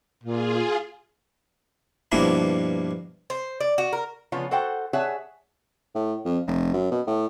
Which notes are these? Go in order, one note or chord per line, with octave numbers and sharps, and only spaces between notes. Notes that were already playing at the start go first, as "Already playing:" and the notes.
A#2 F4 G#4
G2 B2 F3 A#3 D4 E4
C5
D5
F#4
A#4
C#3 F3 B3 F4 C#5
F#4 A4 C5 F#5 G5
G#4 C#5 E5 F#5 G#5 A5
A2
F2
F1
F#2
B2
A2